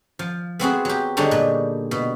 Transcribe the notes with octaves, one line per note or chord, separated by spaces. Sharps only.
F3
B3 C4 F#4 G#4
F#3 G4
D3 G3 D4 D#4 G#4 C#5
A#2
B2